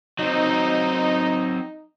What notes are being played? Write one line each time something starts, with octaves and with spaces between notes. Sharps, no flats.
F#3 C4 D#4